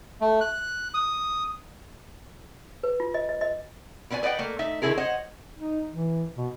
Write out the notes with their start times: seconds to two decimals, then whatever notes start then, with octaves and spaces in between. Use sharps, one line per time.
0.21 A3
0.41 F#6
0.94 D#6
2.83 B4
3.00 F4
3.14 D#5
3.29 D#5
3.41 D#5
4.10 B2 B3 B4 D5 G#5
4.23 B4 D5 D#5 F#5 G5
4.39 A3 A#3
4.59 A3 D#4 E5
4.82 D3 D#3 B3 E4 G#4 A#4
4.97 C5 C#5 D#5 F#5
5.59 D#4
5.89 E3
6.37 B2